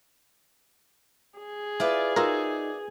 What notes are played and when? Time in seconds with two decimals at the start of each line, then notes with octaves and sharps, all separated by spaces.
1.39 G#4
1.80 E4 F4 B4 D5
2.16 D#4 F4 F#4 A#4 D5 E5